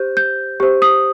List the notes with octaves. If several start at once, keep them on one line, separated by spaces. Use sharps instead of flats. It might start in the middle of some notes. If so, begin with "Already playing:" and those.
Already playing: G4 C5 G6
G6
G4 C5
D#6